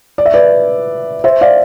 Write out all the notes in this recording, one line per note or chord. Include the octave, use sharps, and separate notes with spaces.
D5
E5
B4 D5
C5 E5
D5 F5